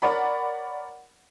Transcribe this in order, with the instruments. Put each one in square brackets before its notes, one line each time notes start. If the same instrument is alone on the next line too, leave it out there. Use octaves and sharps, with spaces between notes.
[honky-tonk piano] A#4 C#5 D5 F#5 B5